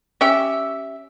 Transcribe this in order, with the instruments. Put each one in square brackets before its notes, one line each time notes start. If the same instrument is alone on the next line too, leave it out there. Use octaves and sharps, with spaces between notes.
[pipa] C#4 G4 E5